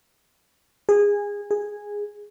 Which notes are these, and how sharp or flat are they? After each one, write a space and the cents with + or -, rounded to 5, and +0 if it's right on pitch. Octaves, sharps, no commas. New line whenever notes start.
G#4 -20
G#4 -10